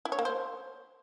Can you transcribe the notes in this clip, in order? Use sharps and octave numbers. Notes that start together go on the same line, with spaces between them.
E4
C#5
A#3
C5